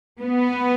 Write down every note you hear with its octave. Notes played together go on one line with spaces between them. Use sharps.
B3